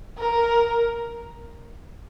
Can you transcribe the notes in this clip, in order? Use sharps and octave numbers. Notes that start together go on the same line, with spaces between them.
A#4